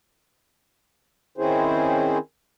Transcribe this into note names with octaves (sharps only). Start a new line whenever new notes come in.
D#3 C4 C#4 E4 G#4 C5